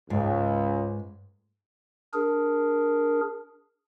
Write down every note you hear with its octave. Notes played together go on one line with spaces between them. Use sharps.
C#2 G#2
D4 G#4 A#4